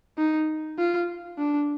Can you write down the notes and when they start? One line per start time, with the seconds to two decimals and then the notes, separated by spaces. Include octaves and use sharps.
0.18 D#4
0.79 F4
1.38 D4